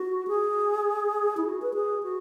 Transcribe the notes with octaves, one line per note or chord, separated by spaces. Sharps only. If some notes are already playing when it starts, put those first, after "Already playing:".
Already playing: F#4
G#4
E4
F#4
B4
G#4
F#4